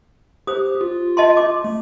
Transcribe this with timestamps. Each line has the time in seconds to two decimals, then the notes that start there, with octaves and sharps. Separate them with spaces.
0.47 G4 C5 D#6
0.81 F4
1.17 D#5 A5 C6
1.37 D6
1.64 A3